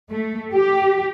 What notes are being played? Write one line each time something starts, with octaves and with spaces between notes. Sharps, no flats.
A3
G4